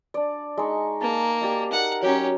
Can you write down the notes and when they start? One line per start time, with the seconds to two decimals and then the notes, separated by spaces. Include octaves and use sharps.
0.14 D4 D5
0.58 G#3 D#4 C#6
1.01 A#3 A5
1.42 G4 D5 D#5
1.72 D#4 A#4 F#5
2.02 F#3 C#4 G4